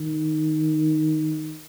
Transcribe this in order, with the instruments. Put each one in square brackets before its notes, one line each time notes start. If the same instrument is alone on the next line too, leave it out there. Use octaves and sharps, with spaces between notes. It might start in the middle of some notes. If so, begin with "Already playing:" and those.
Already playing: [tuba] D#3